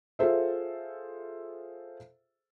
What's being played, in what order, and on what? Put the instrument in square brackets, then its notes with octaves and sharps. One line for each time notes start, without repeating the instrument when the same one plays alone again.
[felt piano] F4 G#4 A4 C5 E5